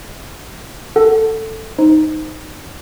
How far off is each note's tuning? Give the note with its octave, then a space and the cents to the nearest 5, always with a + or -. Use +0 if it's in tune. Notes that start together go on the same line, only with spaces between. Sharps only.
A4 +10 F#5 +0
D#4 +0 C5 +0